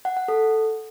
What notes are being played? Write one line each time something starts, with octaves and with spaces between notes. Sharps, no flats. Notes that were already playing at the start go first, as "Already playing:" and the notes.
F#5
F#5
A4